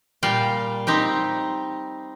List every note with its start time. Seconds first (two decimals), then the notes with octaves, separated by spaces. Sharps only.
0.23 A#2 G3 F5 G5
0.87 C4 D#4 G4 G5